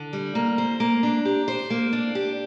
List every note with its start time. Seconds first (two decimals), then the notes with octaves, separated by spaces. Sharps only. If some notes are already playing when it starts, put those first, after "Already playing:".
Already playing: D3
0.13 G3
0.35 A#3
0.58 C5
0.80 A#3
1.03 D4
1.25 G4
1.48 C5
1.70 A#3
1.93 D4
2.15 G4